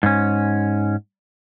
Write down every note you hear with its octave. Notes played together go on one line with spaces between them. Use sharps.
G#2 C#4